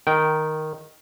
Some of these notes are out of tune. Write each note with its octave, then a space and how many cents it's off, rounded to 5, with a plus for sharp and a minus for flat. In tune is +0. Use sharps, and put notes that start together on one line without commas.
D#3 +0 G5 -20